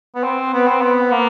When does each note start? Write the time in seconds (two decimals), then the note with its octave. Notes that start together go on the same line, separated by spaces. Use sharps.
0.15 B3
0.24 C4
0.53 B3
0.67 C4
0.81 B3
1.11 A#3